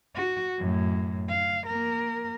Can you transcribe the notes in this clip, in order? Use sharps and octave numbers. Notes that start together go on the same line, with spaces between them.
F#4
F#2 A2
F5
A#3 A#4